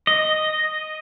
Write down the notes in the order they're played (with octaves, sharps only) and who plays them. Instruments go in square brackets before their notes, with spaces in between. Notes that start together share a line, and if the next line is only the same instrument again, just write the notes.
[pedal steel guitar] D#5